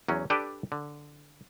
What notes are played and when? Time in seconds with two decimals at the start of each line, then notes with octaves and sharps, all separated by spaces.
0.08 E2 F#3 C#4
0.30 D4 G4 A4 B4 D5
0.72 D3